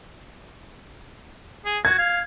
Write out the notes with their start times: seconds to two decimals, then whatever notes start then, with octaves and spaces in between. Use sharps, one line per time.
1.65 G#4
1.85 F#4 G#6
1.98 F5